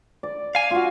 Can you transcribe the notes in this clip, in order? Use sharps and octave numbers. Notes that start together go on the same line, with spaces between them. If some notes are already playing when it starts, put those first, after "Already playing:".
D5
F5 G#5
F4 F#4